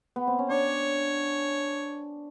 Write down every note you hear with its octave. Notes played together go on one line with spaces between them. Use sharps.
B3
C4
C#4
D4 C#5